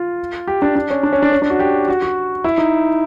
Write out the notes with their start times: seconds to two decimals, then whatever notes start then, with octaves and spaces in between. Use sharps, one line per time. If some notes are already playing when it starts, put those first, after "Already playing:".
Already playing: F4
0.47 G4
0.62 D4
0.76 D4
0.90 C#4
1.03 D4
1.13 C#4
1.22 D4
1.32 C#4
1.42 D4
1.50 F#4
1.60 G4
1.88 F#4
2.02 F#4
2.44 E4
2.58 D#4